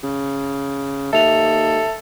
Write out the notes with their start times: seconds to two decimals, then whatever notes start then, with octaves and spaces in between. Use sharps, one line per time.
0.03 C#3
1.13 D#2 A4 E5 F7